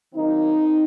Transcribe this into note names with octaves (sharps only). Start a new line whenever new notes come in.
D#3 F#3 A#3 C4 D#4